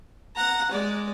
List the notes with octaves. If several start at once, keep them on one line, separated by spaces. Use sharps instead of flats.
F#5 A#5
G#3 D5